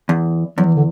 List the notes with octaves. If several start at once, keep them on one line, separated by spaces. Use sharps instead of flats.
E2
E2 F#3
E3
D3